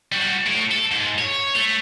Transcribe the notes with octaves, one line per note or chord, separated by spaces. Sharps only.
G3 F#4
A2
A4
G#2
C#5
A3